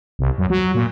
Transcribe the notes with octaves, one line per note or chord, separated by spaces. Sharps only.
C2
F#2
F#3
A#2